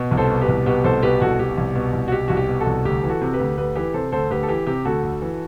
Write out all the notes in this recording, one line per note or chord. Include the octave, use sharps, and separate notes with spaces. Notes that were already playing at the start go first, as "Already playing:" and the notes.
Already playing: B2
C2
A4 C5
B2
G4 B4
C2
B2 G4 B4
C2 A4 C5
B2 G4 B4
C2 F#4 A4
B2 G4
C2
B2
C2
F#4
B2 G4
C2 F#4
G4
B2
F#4 A4
C2
D2 G4
E3
F#4 A4
C3
G4 B4
D2
D2 G4 B4
E3 G4 B4
C3 A4 C5
D2 A4 C5
D2 G4 B4
A4
E3 G4
C3 G4
D2 F#4 A4
D2
E3